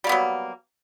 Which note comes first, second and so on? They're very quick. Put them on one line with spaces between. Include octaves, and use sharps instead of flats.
G3 A#3 B3 F#3